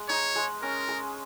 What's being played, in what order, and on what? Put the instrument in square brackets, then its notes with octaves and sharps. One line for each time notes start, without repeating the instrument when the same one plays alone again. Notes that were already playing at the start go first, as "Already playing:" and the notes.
Already playing: [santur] G#3
[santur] D#4 [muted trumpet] C#5
[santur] G#3
[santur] C#4 [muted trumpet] A#4
[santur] G#3